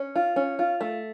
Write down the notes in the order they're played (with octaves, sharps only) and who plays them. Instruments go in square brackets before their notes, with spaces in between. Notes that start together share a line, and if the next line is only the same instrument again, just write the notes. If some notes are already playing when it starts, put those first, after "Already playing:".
Already playing: [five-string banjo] C#4
F4
C#4
F4
A3